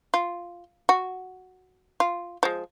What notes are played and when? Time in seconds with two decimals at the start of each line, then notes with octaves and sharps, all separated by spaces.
0.14 F4
0.89 F#4
2.00 F4
2.43 F3 G#3